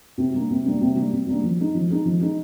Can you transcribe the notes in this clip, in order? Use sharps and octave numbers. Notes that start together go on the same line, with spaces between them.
C3
G3 A#3 D4
C3
G3 A#3 D4
C3
G3 A#3 D4
C3
G3 A#3 D4
F3
G#3 D#4
F3
G#3 D#4
F3
G#3 D#4